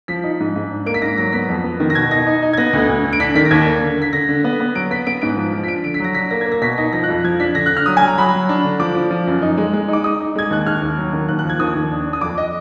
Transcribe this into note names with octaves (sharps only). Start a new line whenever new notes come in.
F3 B6
D#4
G#2
G#2
D4
A#3 D7
B6
G#2 A#6
F#3 A#6
B3 B6
F2
B3
D#3
A#6
B2 G#6
D#4 A#6
D#4
D#4
G#6
B3 A#6
D2
D2
D3
D7
D4 B6
D#3 B6
A#6
D#2 G#6
A#3
D3
D3 B6
D3 A#6
D3
B3
B3
F#3 D7
B3 B6
B3 D7
G#2 D7
F3
F3
B6
D4 D7
D3 D7
B6
F#3 A#6
D4 B6
A#3 A#6
G#6
A#3
A#6
B2 B6
D#4 A#6
F3 A#6
F#6
F2
F3 G#6
D4 B6
D3 A#6
F#6
D3
F6
F#3 D#6
G#5
F#3 A#5
F#3 B5
F#3
D4
D3
F3 D6
F3
F3
F#2
D#4
G#3
G#3
D#4 D6
D#4 D#6
D#4
G#3 G#6
D#2 F#6
D#2 F6
D#2
F#3
D#3
D#2 F#6
F#6
F3
G#6
D#2 D#6
D#2
D4
D4
D#6
F2 D6
D#5